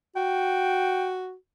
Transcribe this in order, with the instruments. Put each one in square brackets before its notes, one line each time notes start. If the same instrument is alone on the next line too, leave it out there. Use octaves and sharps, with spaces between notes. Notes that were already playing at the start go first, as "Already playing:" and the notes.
[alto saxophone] F#4 [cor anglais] G5